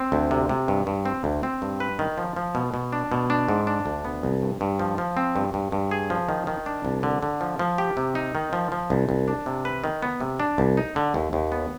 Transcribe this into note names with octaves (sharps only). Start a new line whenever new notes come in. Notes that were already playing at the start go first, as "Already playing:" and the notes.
Already playing: C4
D2
C3
C3
G2
G2
C4
D2
C4
G2
B4
D#3
F3
F3
B2
B2
D4
B2
D4
G#2
D4
D2
B3
C2
G2
G2
F3
F3
C4
G2
G2
G2
G#4
F3
D#3
D#3
D4
C2
D3
D3
F3
F3
G4
C3
D#4
D#3
F3
F3
C2
C2
D4
C3
B4
D#3
B3
C3
D4
C2
D#4
D3
D#2
D#2
B3